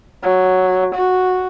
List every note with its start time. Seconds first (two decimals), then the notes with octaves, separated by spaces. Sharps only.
0.23 F#3
0.94 F#4